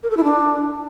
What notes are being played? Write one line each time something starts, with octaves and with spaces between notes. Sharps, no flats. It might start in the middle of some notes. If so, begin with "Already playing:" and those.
A#4
A4
E4
D4